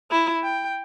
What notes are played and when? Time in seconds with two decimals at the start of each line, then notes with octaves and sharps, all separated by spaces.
0.11 E4
0.43 G5